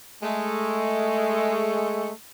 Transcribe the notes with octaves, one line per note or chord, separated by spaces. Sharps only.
G#3 A3